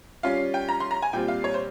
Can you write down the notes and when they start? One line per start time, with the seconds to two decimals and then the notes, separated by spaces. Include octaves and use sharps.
0.23 G3 C#4 F4 F5
0.54 G5
0.69 A#5
0.80 C6
0.91 A#5
1.02 G#5
1.13 A#2 G3 C4 F4 G5
1.28 F5
1.44 C#5
1.54 C5